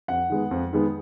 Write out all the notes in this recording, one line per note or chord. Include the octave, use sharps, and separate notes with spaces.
F2 F#5
D#3 G#3 B3
F2
D#3 G#3 B3